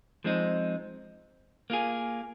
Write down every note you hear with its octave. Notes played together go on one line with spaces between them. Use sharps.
F3 G#3 C4 D#4
A#3 F4 G#4